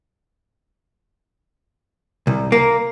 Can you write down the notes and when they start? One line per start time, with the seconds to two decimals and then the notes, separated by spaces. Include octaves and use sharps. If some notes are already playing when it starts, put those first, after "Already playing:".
2.27 C2
2.52 A#3